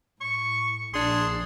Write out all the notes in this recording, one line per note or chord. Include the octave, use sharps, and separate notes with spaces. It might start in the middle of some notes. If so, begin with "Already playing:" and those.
A2 C#6
A#1 D4 G#4 C6